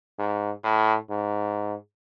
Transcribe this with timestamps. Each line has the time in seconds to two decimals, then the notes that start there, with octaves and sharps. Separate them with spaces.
0.19 G#2
0.63 A2
1.10 G#2